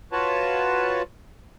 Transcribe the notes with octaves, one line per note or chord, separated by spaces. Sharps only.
F4 F#4 B4 C#5 A5